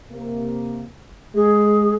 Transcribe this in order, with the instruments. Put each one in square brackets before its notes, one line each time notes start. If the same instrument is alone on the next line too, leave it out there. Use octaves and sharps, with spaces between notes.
[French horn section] C3 A#3
[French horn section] G#3 [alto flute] G#4